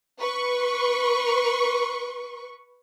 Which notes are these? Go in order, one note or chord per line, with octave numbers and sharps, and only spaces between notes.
B4 C#6